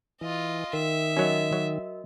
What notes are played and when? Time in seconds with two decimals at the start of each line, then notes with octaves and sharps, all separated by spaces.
0.21 E3 F4 D#5
0.73 D#3 A#4 E5
1.17 F#3 C#4 F#4 A#4 D#5
1.53 F#3